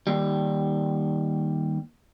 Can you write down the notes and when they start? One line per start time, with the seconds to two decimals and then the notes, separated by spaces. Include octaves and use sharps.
0.07 D#2 G3